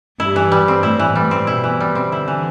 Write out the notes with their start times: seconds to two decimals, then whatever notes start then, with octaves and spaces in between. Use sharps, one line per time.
0.20 G2 E4
0.36 E3
0.52 G3
0.68 C4
0.83 A2 E4
0.99 E3
1.16 A2 G3
1.31 C4
1.47 B2 E4
1.64 E3
1.81 G3
1.95 C4
2.12 D3 E4
2.28 E3